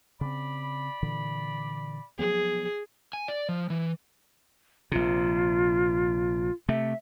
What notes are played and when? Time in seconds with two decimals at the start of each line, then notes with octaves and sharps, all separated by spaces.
0.21 C#3 C4 D5 B5
1.03 A#2 D3 E3
2.19 F3 F#3 B3 G#4
3.13 G#5
3.28 D5
3.49 F3
3.70 E3
4.92 A#1 C3 F4
6.69 C3 A3 E5